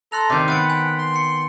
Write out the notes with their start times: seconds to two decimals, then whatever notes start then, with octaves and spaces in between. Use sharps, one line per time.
0.12 A4 A#5 C6 F#6 F7
0.30 C3 D#3 D5 E5
0.48 B3 F#5 B5 D#6 A6 D7
0.70 G#5
0.98 C6
1.16 C#7